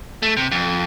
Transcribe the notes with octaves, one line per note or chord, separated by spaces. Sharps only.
A3
C3
F2